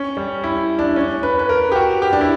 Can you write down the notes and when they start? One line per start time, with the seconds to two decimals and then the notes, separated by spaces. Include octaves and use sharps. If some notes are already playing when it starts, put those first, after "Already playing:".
Already playing: C#4
0.17 G3
0.44 E4
0.79 D4
0.96 C#4
1.23 B4
1.39 B4
1.49 A#4
1.72 G4
1.76 F#4
2.02 G4
2.13 D4
2.21 E4